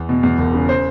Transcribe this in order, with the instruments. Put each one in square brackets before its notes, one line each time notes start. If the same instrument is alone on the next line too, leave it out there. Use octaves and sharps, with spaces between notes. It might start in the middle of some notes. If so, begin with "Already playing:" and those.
Already playing: [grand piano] E2
B2
E2
E1
C#3
C5